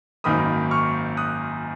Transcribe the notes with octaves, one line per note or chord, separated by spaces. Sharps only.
G#1 F#2 D#3 A#3 B5 D#6
C#6 F6
D#6 F#6